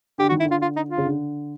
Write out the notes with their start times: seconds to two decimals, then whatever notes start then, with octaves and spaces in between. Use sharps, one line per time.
0.18 D3 G4
0.29 F#4
0.32 D#3
0.40 E4
0.45 D3
0.51 F4
0.62 F4
0.76 D#4
0.90 F4
0.98 C#3
1.05 D3